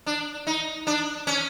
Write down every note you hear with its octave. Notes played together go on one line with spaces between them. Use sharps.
D4
D#4
D4
C#4